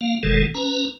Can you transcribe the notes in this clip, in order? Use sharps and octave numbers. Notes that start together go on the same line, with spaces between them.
A#3 F5
F#1 B2 D#3 E3 G#3 A4
C#4 B4 A#5